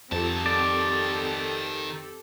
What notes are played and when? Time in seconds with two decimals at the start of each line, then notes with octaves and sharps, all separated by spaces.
0.12 F2 D#3 C4 G4 A4 A5
0.46 D5